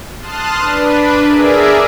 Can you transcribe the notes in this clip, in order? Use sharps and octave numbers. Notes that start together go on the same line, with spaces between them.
A5 C6 D#6 F6 F#6
D4 B4
G#4 A#4 D5 E5